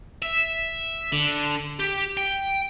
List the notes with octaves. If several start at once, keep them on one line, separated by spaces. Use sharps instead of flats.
E5
D3
G4
G5